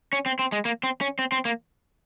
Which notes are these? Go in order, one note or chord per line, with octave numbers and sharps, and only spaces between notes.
C#4
C4
C4
G#3
A#3
C4
C#4
C4
C4
A#3